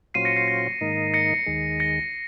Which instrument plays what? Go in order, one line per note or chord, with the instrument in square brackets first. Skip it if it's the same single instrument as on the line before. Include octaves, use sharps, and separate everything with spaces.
[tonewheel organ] A#2 F#3 C#4 F4 C5 [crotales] C7 D#7
[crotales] A#6 C#7
C7
A#6
[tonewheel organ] G#2 D#3 A#3 D#4
[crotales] A#6 C#7
[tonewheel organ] D#2 D#3 G#3
[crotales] A#6 C#7